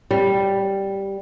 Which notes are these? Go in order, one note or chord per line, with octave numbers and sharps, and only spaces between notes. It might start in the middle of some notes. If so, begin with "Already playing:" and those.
G3